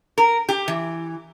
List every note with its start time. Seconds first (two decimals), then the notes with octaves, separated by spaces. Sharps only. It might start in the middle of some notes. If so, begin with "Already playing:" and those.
0.18 A#4
0.49 G4
0.68 E3